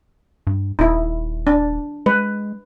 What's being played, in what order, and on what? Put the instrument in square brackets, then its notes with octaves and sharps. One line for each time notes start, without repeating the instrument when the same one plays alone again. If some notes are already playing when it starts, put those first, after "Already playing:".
[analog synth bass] G2
[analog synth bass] D#1 [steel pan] D#4 E4
[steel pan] D4
[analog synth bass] G#3 [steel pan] B4